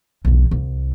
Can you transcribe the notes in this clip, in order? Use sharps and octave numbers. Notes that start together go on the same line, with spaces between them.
B1 E2
C2